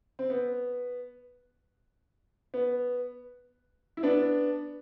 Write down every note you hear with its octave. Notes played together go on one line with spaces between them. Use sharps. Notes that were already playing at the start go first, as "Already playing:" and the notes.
C4
B3
B3
E4
B3 D4